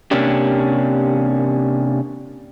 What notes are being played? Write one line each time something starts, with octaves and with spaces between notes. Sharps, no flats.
C3 A#3 C#4 D4 G4